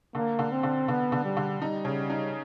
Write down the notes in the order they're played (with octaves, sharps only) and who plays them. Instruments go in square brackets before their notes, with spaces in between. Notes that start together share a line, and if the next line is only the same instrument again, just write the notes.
[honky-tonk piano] D3 [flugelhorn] A#3
[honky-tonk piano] D3
[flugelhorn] C4
[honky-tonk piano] D3
[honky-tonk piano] D3 [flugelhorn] B3
[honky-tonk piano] D3
[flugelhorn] G3
[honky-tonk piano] D3
[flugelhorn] G3 [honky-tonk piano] D#4
[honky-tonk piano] C#3
D#4